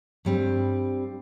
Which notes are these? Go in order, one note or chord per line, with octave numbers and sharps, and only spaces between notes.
G2 G3 C4